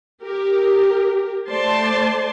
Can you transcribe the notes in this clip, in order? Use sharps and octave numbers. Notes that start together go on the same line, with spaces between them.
G4 A#4
A3 C5 D5 A5 C6